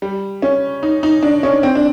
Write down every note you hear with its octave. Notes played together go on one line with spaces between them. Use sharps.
G3
C#4
D#4
D#4
D4
C#4
C4
D4